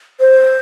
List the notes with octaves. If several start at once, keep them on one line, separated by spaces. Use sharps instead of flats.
C5